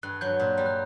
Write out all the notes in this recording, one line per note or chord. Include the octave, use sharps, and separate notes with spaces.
G2 F#6
F#3 G6
A#2
G3
F#6